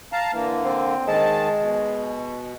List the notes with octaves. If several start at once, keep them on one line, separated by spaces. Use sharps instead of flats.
F5 A5 A#5
D3 E3 A#3
C4
D#3 G#3 A5
B2